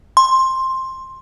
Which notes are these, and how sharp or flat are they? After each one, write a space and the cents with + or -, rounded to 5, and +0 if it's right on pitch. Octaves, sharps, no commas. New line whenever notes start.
C6 +10